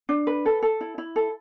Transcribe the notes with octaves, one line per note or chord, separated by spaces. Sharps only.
D4
B4
A4
A4
E4
E4
A4